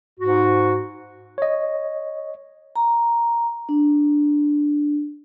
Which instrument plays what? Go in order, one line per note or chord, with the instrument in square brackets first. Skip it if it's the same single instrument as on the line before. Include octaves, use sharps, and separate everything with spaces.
[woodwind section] G#2 F#4
[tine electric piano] C#5 D#5
[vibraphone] A#5
D4